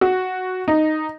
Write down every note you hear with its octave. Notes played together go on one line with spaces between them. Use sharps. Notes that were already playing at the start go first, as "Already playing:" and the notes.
F#4
D#4